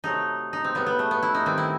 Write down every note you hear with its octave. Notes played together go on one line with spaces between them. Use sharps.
C3 F#3 A3 D#4
D#4
C4
A2 G3 B3
B3
A3
B3
E4
D#4
D#3 G3 C4
E4